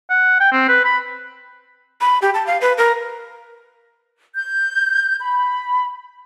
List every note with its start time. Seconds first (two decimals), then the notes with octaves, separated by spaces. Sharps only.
0.10 F#5
0.40 G5
0.52 C4
0.68 B4
0.85 B5
2.01 B5
2.22 G4
2.34 A5
2.47 F5
2.61 B4
2.78 A#4
4.35 G6
5.20 B5